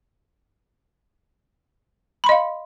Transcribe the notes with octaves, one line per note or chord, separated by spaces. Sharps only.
D#5 F5 B5 C6